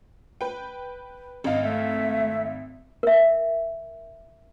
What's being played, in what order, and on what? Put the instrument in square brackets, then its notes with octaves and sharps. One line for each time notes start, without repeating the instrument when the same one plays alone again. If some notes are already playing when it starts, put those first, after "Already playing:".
[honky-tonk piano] B4 G5
[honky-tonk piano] G#1 F5 [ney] D#5
[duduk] A3 [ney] E5
[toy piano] A#4 E5